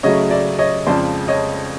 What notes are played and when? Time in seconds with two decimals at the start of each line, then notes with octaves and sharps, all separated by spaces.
0.03 C#3 F#3 A3 C#5 D#5
0.31 D5 E5
0.59 C#5 D#5
0.86 F2 C#3 F3 G#3 C5 D5
1.28 C#5 D#5